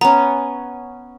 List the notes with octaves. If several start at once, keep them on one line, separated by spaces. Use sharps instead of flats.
B3 C#4 A#5